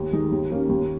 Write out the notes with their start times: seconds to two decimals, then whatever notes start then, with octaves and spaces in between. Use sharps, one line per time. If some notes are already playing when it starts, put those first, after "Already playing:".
Already playing: D#2
0.12 D#3 G#3 D#4
0.31 D#2
0.51 D#3 A#3 C#4 G4
0.69 D#2